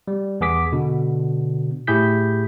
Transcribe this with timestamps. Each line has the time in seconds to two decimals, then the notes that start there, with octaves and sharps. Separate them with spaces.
0.08 G3
0.41 E2 B3 G#4 D6 B6
0.72 B2 D3
1.87 A2 E4 G4 G#4 G6 B6